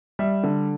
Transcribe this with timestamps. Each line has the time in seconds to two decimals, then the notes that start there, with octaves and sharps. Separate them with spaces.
0.19 G3 E5
0.44 D3